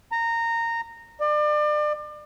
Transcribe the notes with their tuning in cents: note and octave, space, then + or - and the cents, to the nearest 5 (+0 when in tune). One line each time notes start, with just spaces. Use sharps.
A#5 -15
D5 +35